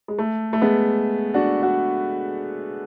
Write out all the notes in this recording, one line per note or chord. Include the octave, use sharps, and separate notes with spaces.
G#3
A3
A3
G#3 B3
D4 F#4
D4 F#4